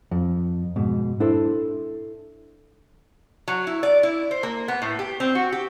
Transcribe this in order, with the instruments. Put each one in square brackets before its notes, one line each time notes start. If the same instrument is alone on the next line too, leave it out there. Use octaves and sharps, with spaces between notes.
[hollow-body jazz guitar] F2
G#2 B2
D4 E4 A4 C5
[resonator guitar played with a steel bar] F#3
E4
D5
E4
C5
A#3
B3
A2
G4
C4
F#4
G4